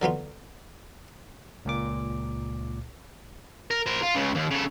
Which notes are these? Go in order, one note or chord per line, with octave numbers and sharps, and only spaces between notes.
D3 F#3 B3 F4
C#2 A#2 D6
A#4
A#4 C5
F4
C#2 C#3
D#2
C#3 A4